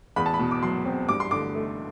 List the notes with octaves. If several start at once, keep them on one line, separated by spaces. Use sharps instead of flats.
E2 B5
A5
B5
B2
D6
F#3 C6
C4
G2 D6
C6
D3 D6
A3